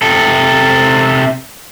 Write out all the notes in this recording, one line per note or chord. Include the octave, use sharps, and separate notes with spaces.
C3 A4